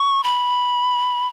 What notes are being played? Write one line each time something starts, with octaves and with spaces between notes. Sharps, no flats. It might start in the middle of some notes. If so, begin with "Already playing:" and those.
Already playing: C#6
B5